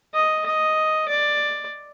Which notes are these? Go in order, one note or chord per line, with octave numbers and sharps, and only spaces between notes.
D#5
D#5
D5